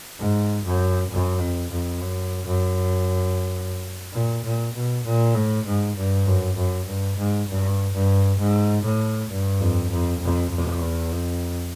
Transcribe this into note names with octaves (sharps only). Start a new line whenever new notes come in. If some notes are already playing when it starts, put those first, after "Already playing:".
G#2
F#2
F#2
F2
F2
F#2
F#2
A#2
A#2
B2
A#2
A2
G#2
G2
F#2
F#2
G2
G#2
G2
G2
G#2
A2
G2
F2
F2
F2
F2
E2
F2